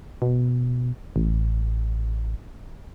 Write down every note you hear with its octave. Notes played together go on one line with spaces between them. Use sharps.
B2
A1